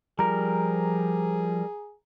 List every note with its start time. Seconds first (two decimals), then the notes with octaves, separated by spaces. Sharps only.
0.19 F3 G3 G#4 A#4 A#5